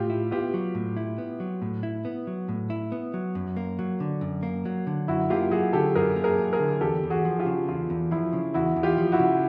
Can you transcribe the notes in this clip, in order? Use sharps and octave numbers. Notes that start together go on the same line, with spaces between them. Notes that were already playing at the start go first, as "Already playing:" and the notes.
Already playing: A2 F4 G4
E4
B3 F4 G4
F#3
A2
E4
B3
F#3
A2
E4
B3
F#3
A2
E4
B3
F#3
F#2
A#3
F#3
D3
F#2
A#3
F#3
D3
F#2 E4 F#4
A#3 F4 G4
F#3 F#4 G#4
D3 G4 A4
F#2 G#4 A#4
A#3
G#4 A#4
F#3
G#4 A#4
D3
E2 G4 A4
E2
F#4 G#4
F3
F4 G4
C#3
E2 F4
E2
F3 E4
C#3
E2 E4 F#4
E2
F4 G4
F3
E4 F#4
C#3